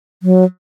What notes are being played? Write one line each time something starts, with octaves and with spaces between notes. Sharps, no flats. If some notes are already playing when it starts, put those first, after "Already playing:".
F#3